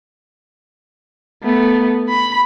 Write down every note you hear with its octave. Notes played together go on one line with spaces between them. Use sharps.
A3 B3
B5